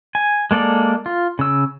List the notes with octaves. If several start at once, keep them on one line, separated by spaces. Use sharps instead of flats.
G#5
G#3 A#3 A4 D5
F4
C#3 E6